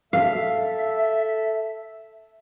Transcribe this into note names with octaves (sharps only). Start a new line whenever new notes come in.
A4 E5 F5